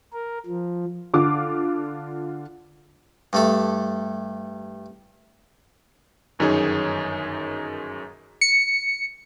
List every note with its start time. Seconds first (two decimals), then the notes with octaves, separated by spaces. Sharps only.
0.13 A#4
0.46 F3
1.14 D3 F4 D6
3.33 G2 A3 A4
6.39 G1 F#2 D#3 D#4 G#4 C#5
8.41 C#7